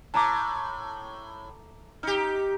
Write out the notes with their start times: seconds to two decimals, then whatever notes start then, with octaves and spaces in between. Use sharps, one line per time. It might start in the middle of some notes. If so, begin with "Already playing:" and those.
0.14 A2 A5 A#5 D6
2.03 D#4 G4 F6